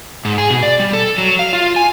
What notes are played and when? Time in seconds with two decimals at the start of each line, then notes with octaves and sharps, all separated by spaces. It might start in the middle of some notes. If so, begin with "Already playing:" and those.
0.25 G#2
0.38 G#4
0.50 B2
0.63 D5
0.80 G3
0.93 A4
1.18 F#3
1.39 F5
1.53 F4
1.76 G#5